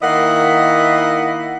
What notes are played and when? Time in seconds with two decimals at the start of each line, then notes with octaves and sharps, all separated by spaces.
0.03 D#3 A#3 E4 D#5 F#5